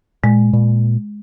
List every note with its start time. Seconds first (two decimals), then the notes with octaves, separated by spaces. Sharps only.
0.24 A#2 G#3
0.53 A#2